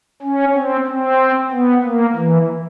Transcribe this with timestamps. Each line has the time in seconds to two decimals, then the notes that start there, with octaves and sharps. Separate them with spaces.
0.22 C#4
0.54 C4
0.86 C4
1.52 B3
1.83 A#3
2.16 E3